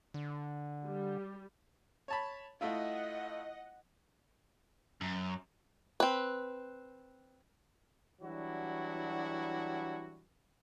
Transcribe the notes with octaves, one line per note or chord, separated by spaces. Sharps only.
D3
G3
C#5 A5 B5
A3 E4 F4 D#5 F#5
F#2
C4 B4
E3 F#3 G3 D4 E4 F#4